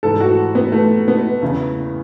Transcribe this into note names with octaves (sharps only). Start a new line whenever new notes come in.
G#2 E3 A4
F#4
B3
A3
B3
E2 C#3 E3